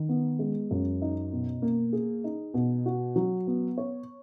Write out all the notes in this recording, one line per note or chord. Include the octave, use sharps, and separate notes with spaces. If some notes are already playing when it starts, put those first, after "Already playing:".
Already playing: D#3
B3
G#3
F#2
D#4
B2
A#3
G#4
D#4
B2
F#4
F#3
B3
C#5